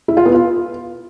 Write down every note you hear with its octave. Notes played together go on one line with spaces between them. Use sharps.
E4
F4
B3
F4